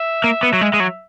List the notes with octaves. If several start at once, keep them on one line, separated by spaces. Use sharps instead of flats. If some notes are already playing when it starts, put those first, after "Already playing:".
Already playing: E5
A#3
B3
F#3
G#3
G#3
F#3